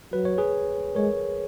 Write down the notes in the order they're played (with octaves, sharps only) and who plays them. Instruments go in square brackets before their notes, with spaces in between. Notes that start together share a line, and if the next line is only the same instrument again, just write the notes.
[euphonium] F#3 [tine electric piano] B4
[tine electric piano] C#5
G#4 B4
[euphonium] G#3 [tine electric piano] A#4 C#5